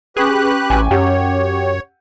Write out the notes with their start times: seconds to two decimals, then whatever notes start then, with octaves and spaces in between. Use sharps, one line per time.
0.17 C#4 G4 G#4 B4 C#6 D6 F#6
0.70 A1 G5 G#5
0.91 F#2 G4 C#5 F#5